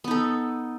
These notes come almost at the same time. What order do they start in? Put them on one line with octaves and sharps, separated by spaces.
B3 D#4 A4